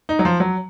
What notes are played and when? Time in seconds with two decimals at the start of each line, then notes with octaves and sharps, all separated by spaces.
0.09 D#4
0.19 F#3
0.25 F3
0.40 F#3